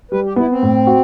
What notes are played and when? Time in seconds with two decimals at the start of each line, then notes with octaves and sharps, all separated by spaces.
0.11 G3 B4
0.25 G4
0.36 B3 E4
0.50 C4
0.63 A2
0.87 F#4